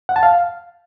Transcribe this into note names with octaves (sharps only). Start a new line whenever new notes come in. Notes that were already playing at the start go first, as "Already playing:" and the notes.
F#5
A5
F5